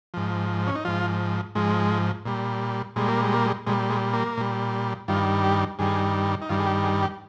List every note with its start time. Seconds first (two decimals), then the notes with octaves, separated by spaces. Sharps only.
0.14 G#2 F3
0.67 C#4
0.75 D#4
0.85 G#2 F3 F4
1.55 G#2 F3 G#3
2.26 A#2 G3
2.96 A#2 G3 G#3
3.08 A#3
3.22 G#3
3.34 A#3
3.46 G#3
3.67 A#2 G3 G#3
3.90 G#3
4.13 A#3
4.37 A#2 G3
5.08 G2 D#3 G3 F4
5.44 G4
5.79 G2 D#3 G3 G#4
6.42 D#4
6.49 G2 D#3 G3 F4
6.59 G#4
6.67 G4
6.84 G#4
7.02 G4